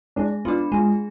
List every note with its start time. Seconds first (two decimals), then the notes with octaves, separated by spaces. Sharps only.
0.16 G#3 D4
0.45 B3 D4 F4
0.72 G#3 F4